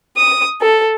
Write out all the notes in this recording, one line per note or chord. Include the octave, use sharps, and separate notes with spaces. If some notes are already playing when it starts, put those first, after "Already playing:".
D#6
A4